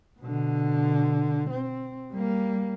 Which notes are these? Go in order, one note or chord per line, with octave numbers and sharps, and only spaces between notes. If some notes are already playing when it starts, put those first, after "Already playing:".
B2 D3
C4
G3 A#3